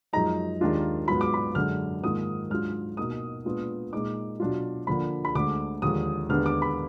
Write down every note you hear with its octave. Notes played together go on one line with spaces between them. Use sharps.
F#2 F3 G#3 D#4 A#5
D#2 D#3 G#3 D4 F4
G#2 F#3 B3 F4 B5
D6
B5
F#2 D3 G#3 F6
G#2 D#3 A#3 F4 D#6
G#2 F#3 D4 F4 F6
B2 A#3 D#4 D#6
A#2 G#3 B3 D4 F4
A#2 G#3 D#4 D6
B2 F#3 D4 F4
D3 F3 A#3 D4 B5
B5
D2 D3 G#3 D6
D#2 D3 F3 G#3 D#6
D#2 D3 G#3 B3 D4 F6
D6
B5